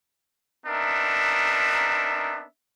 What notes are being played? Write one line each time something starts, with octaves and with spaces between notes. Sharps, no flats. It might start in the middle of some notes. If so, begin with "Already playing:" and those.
B3 C4 D4 D#4 A#4 E5